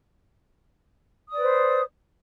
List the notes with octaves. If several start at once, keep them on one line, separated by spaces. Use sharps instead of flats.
B4 C5 D5 D#6